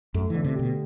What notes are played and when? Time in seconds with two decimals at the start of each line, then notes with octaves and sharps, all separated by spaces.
0.14 F#2 A3
0.30 D3 E3
0.45 C3
0.55 B2 G4